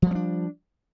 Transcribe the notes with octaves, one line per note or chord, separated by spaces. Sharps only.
F3 G3 C4 D4